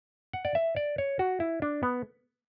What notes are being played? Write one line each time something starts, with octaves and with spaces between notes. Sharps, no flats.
F#5
D5
E5
D5
C#5
F#4
E4
D4
B3